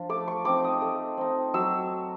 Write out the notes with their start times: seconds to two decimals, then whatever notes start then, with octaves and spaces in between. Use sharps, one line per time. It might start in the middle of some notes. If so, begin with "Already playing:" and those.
Already playing: F3 D4 F4
0.09 A3 D6
0.28 C#6
0.45 C4 D#4 D6
0.64 D#6
0.82 A3
1.17 C4 D#4
1.54 F#3 E6